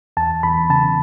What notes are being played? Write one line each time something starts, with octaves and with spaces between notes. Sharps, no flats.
E2 A5
E2 B5
C#3 A5